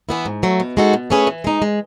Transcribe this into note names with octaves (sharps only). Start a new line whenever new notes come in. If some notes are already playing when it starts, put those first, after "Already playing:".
E3 B3 E4
G#2
F#3 A3
B2
G#3 D#4 F#4 A4
B2
A3 C#4 G#4 B4
E3
G#3 D#4
G#3